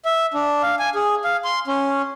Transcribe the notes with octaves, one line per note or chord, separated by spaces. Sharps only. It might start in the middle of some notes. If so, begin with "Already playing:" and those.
E5
D4
F5
G#5
G#4
F5
C6
C#4